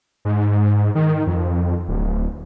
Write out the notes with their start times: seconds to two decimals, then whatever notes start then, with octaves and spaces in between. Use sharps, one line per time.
0.25 G#2
0.95 D#3
1.27 F2
1.88 D1